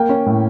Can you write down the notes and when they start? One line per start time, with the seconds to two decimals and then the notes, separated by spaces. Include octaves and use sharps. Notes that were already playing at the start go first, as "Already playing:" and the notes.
Already playing: A#3 G5
0.09 C#4
0.26 A2